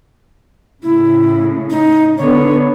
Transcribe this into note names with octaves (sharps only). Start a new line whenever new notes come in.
A2 C#3 E4
D#4
D3 B3 C#5